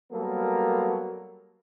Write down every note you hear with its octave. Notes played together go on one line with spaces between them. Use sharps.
F#3 G3 A#3 B3 A4 A#4